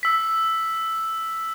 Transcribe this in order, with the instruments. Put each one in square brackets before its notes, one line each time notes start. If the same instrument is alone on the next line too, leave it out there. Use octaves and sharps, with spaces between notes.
[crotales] E6 B6